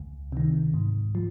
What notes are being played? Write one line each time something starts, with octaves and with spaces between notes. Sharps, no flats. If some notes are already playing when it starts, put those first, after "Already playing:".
Already playing: C#2
C3 D#3
G#2
F3